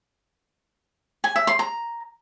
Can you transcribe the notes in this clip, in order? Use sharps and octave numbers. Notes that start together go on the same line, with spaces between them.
G#5
E5
C6
A#5